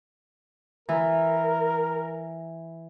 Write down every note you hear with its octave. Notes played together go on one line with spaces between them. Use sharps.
E3 A#4